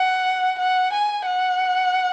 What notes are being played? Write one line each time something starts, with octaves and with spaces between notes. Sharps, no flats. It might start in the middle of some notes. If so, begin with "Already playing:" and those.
Already playing: F#5
F#5
G#5
F#5